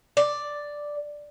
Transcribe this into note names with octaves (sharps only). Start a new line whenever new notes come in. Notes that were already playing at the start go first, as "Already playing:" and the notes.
D5